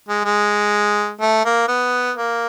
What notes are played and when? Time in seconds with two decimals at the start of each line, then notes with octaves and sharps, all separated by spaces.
0.09 G#3
0.25 G#3
1.21 A3
1.45 A#3
1.68 B3
2.17 A#3